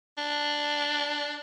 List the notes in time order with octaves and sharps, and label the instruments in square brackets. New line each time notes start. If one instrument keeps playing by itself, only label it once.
[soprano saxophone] D4